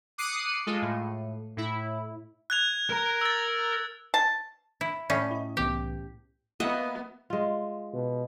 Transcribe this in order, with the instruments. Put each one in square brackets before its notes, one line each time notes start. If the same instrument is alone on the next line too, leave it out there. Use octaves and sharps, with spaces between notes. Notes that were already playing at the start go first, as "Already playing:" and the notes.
[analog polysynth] D6 D#6 F#6 C7 C#7 D#7
G#3 F4 A4
A2
A2 E4
[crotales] F#6 G#6 F7
[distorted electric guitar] A#4 A#5
[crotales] E6 A6
[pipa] A5
[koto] E4
[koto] A2 C#4 [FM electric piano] D5 B5
[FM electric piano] E4 D#5
[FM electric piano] C2 E3 B3 [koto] G4
[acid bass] A#3 [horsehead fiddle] B3 [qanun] D#5 E5 F#5
[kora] G#3 F4
[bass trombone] B2